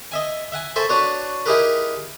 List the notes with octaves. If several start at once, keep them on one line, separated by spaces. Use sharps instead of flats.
D#5 E5 G#5
E5 F#5 G#5
A4 C5 E5 G#5 B5 C#6
D4 F#4 B4 C#5
D#4 E4 G4 G#4 A#4 B4